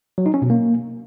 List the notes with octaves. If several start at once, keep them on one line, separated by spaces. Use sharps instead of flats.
F#3
D#4
C#4
B2
A#3